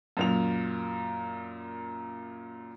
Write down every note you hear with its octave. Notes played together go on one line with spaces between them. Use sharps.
F#2 A#2 F7